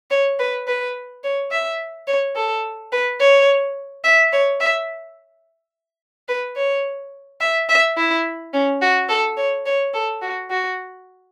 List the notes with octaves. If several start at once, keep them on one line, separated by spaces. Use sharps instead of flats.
C#5
B4
B4
C#5
E5
C#5
A4
B4
C#5
E5
C#5
E5
B4
C#5
E5
E5
E4
C#4
F#4
A4
C#5
C#5
A4
F#4
F#4